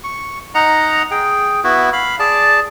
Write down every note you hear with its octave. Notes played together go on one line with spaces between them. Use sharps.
C#6
D#4 D#5 F#5 A#5
G#4 G5
B3 E4 F#4
F5 B5
G#4 D5 A5